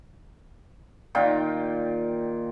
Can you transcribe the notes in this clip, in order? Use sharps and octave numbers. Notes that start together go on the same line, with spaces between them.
A#2 D#3 F4 G5